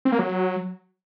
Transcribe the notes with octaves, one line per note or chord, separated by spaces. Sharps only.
C4
A#3
F#3